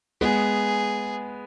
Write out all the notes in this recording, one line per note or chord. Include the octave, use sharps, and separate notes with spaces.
G#3 B3 G#4